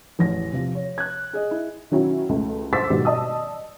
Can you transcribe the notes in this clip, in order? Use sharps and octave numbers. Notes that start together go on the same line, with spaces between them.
A1 E2 A#6
C3 F3
C#5
F#6 G#6
G#4 D#5
E4
D#3 F#3 C#4 E4
C#2 A3
C5 C6 D6 E6 A6 B6
G#2 B2 D#3 G3
D5 D#5 A5 D#6 E6